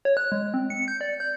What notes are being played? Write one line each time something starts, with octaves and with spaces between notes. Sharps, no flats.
C#5
F#6
G#3
C4
C#7
G6
D5
G6